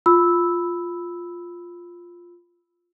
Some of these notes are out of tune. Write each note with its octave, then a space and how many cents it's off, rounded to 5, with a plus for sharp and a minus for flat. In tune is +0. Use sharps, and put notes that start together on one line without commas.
F4 +0 B5 +5 E6 -10